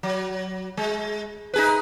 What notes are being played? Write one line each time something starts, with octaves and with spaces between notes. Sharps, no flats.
F#3
G#3
D#4 G#4 B4